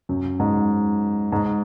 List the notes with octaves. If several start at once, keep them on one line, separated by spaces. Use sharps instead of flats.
F#2
G#2
G#2